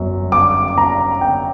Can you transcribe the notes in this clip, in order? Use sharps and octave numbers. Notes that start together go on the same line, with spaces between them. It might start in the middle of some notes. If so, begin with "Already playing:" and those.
Already playing: G1 F#2 F#3
D6
A#5
G5